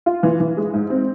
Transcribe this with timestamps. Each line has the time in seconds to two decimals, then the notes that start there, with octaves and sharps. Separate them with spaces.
0.06 F4
0.23 E3
0.40 E3
0.57 G#3
0.73 G#2
0.90 C4